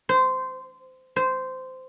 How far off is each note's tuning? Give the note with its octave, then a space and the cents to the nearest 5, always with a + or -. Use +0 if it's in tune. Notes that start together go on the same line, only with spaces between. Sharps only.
C5 -20
C5 -15